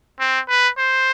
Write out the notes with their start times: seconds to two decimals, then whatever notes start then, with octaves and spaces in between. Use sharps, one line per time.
0.20 C4
0.48 B4
0.78 C5